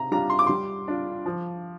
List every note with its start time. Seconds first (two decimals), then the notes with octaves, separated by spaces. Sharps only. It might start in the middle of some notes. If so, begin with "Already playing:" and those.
Already playing: C3 A#5
0.11 G3 D4 F4 A#5
0.30 C6
0.39 D6
0.47 G3 C6
0.88 D4 F4
1.26 F3